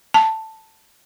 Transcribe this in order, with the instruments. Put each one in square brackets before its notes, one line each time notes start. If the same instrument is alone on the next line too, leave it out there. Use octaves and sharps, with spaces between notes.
[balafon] A5